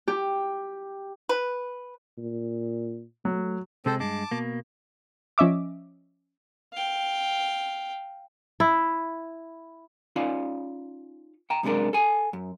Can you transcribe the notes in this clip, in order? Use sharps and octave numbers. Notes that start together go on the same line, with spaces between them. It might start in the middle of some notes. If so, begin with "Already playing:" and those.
G4
B4
A#2
F#3 A3
C3 G#3 C4 A4 C5
G2 G#3 A5 D6
B2 A#3
F3 C#4 D#5 E5 D6
F5 G5
E4
C#4 D#4 F4 D5 F5
G5 A#5
F#2 C3 G#3 D4 A#4
A4 G#5
F#2